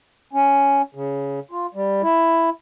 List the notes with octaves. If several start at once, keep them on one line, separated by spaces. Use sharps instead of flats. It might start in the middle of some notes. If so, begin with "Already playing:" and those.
C#4
C#3
F4
G3
E4